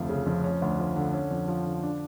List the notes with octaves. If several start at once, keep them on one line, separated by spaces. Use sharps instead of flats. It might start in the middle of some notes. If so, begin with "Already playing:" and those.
Already playing: F1 D2 F3
C#3
F2
C#4
D2
F3
D3
C#4
F2
F3
D3
D4